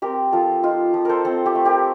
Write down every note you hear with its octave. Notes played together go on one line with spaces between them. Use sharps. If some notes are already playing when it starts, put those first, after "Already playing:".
C4 G4 A#4
F3 F4 A4
D#4 F4
F3
A4 A#4 C5
C4 A4 C5
G4
A3
G4 A#4